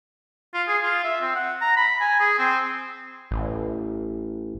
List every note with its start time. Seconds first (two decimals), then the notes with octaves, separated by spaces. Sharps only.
0.54 F4
0.67 G#4
0.83 F4
1.04 E5
1.21 C4
1.35 F#5
1.61 A#5
1.77 B5
2.00 G#5
2.20 G#4
2.39 C4
3.31 A1